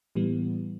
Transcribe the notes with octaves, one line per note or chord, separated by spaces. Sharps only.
A2 E3 G3 B3